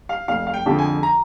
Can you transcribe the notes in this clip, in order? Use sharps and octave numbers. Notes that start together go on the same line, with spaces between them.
F5
F1 F5
F5
G5
F2 D3 F3 G#3
G#5
A#5